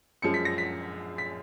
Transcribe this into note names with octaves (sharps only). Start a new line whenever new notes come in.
F#2 F3 G#3 C#7
B6
A#6
B6
B6